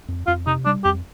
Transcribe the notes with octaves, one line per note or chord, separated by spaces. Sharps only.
F2
F2 F4
C3 D#4
G3 D4
F2 G4